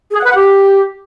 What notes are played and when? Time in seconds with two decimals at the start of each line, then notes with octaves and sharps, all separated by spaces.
0.13 G#4
0.19 F#5
0.24 B4
0.30 F#5
0.36 G4